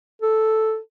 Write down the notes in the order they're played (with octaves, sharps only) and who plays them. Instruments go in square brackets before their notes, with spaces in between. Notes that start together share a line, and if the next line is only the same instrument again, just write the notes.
[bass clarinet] A4